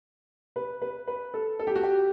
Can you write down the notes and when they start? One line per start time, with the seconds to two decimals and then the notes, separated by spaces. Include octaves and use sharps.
0.56 B4
0.82 B4
1.07 B4
1.34 A4
1.59 A4
1.67 G4
1.75 F#4
1.83 G4